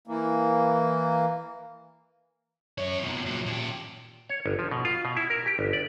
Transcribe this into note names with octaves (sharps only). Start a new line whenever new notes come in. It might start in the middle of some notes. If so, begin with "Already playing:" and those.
E3 A#3
F#2 C#5
F2 B2
A#2 F#3
A#2 G4
C#5
G1
F3
B2
F4
B2
E4
A#4
G4
G1
D5